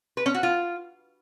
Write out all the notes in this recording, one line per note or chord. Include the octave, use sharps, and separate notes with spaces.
B4
C#4
F#4
F4